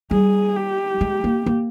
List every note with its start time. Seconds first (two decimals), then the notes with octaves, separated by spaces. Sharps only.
0.11 G3 G#4
0.56 G4
1.01 G#3
1.24 A#3
1.46 A#3